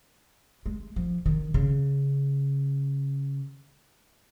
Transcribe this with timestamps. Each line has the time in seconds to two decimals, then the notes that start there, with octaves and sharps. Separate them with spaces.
0.66 G#3
0.96 F3
1.26 D#3
1.54 C#3